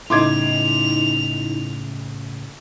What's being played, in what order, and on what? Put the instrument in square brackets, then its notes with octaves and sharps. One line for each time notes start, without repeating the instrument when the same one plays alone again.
[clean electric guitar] A2 C#3 [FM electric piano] D#4 E4 [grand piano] C6 D6 G#6 [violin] F7